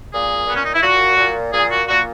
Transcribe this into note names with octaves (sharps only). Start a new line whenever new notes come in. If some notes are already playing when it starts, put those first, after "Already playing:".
A#2 G#4
A#2 B3
C#4
D#4
E4
A#2 F#4
A#2
A#2 G#4
F#4
A#2 F#4